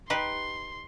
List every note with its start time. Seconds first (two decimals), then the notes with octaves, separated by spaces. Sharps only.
0.10 D#4 G4 B4 C6